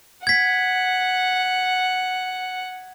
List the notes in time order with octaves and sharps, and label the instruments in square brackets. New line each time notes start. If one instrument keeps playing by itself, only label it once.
[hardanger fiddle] F#5 [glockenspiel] G#6 B6